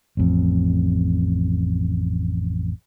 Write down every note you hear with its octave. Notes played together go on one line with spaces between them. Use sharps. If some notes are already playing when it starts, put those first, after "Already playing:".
A1 F2